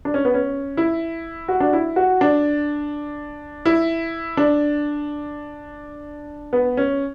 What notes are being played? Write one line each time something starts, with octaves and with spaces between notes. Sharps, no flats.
D4
C#4
B3
C#4
E4
F#4
D4
E4
F#4
D4
E4
D4
B3
C#4